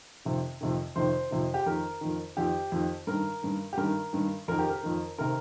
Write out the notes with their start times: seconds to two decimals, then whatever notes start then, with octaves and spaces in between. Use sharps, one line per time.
0.25 F2 C3 D#3
0.61 F2 C3 D#3
0.96 F2 C3 D#3 C5
1.31 F2 C3 D#3
1.54 G4
1.66 F2 D#3 A#4
2.01 F2 D#3
2.37 F2 D#3 G4
2.72 F2 D#3
3.07 G2 D#3 A#4
3.43 G2 D#3
3.73 G4
3.77 G2 D#3 A#4
4.13 G2 D#3
4.48 F2 D#3 A#4
4.59 G4
4.70 A#4
4.83 F2 D#3
5.18 C3 D#3 A#4